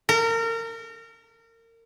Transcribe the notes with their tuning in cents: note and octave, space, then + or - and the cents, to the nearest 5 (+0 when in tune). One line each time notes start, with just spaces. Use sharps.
A#4 -30